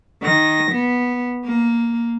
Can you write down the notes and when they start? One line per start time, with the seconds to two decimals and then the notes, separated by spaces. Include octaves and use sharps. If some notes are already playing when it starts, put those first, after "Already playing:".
0.22 D#3 A#6
0.71 B3
1.43 A#3